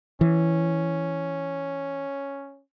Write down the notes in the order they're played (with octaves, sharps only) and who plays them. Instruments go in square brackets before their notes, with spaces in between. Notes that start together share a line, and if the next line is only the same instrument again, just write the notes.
[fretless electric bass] E3 [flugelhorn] C#4